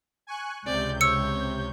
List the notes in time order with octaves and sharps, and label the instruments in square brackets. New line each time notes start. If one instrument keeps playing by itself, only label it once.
[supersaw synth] G#5 C#6 F#6
[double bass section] C#2 [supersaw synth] C3 G6 [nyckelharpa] D5
[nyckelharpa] C#5 [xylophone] E6 C#7